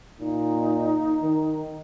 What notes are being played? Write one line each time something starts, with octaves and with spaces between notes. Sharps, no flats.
A#2 D#4
D#3